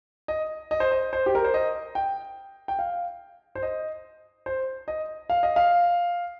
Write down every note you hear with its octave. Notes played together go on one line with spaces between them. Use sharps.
D#5
D#5
C5
D#5
C5
G4
A#4
C5
D#5
G5
G5
F5
C5
D#5
C5
D#5
F5
D#5
F5